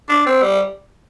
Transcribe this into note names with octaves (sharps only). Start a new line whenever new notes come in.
D4
C4
G3